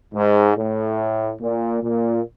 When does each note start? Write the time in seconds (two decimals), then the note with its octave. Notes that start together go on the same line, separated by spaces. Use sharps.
0.14 G#2
0.56 A2
1.40 A#2
1.83 A#2